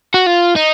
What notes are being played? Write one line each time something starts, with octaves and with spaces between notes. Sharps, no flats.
F#4
F4
D#4